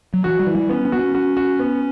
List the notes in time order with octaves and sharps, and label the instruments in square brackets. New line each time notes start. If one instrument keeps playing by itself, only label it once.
[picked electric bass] F#3
[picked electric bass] E3 [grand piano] F#4
[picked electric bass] G3
[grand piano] E3
[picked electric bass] G3
[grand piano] B3 [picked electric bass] C#4
[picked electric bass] C#4
[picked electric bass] B3 [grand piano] F#4
[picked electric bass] C#4
[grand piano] F#4
F#4
B3